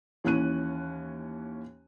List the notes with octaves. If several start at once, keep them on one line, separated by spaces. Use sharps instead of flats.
D#2 E3 C#4 F#6 D#7